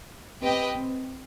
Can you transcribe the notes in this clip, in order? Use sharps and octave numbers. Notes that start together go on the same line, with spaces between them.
C4 G4 B4 D#5 G5
C4